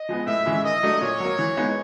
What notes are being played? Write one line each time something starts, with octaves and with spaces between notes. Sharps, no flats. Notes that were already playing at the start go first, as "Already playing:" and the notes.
Already playing: D#5
F3 G#3 B3
A2 E5
E3 G#3 C#4 E4
D#3 D#5
F#3 A3 D4
A#2 C#5
F#3 A#3
E3
G#3 B3 D#4